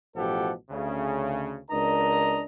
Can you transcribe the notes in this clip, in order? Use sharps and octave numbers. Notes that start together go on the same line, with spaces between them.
A1 B2 F3 G4 A4 F#5
D2 C#3
C#2 D4 A#4 D#5 A#5